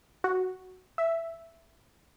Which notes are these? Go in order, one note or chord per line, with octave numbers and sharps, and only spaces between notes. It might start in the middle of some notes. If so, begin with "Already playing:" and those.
F#4
E5